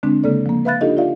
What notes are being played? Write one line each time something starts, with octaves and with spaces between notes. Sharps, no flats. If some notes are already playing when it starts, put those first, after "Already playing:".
D3 G#3 C4 D4
C#3 G#3 A#3 A4 D5
F3 A#3
B4 E5 F5 B5 F#6 A6
D4 D#4 F4 G4 A4 D#5
F4 D5 E5 F5